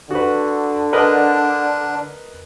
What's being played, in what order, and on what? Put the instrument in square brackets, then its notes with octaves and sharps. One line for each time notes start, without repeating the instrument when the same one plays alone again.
[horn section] D3 [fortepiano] F#4 B4
[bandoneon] D4 [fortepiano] A#4 B4 D#5